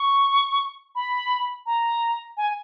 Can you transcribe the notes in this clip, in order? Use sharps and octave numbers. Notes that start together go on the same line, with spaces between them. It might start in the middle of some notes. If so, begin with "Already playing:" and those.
Already playing: C#6
B5
A#5
G#5